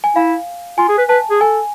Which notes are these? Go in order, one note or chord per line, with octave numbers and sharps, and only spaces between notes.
G#5
E4 F5
F4 G#5
G#4
B4
B4 A5
G#4
A4 G#5